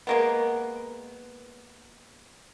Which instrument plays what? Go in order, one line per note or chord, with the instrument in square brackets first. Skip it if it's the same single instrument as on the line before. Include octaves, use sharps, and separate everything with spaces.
[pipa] G#3 A#3 B3